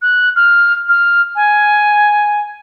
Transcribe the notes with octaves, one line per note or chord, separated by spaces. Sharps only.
F#6
F6
F6
G#5